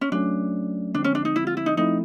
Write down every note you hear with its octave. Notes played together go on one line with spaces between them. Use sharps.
C#4
F#3 A3 C#4 D4
D3 F3 G#3 C4 D4
C#4
D4
D#4
E4
F4
E4
D#4
F3 A3 C4 D#4 E4